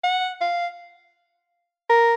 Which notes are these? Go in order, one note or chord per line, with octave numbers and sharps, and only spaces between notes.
F#5
F5
A#4